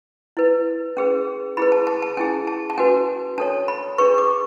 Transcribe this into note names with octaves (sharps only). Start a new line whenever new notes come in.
E4 B4
C#4 G#4 B4
E4 G#4 B4 B5
A5
A5
A5
C#4 E4 G#4 G#5
A5
A5
C#4 F#4 B4 G#5
D4 A4 C#5 A5
B5
D4 G#4 B4 C#6
D6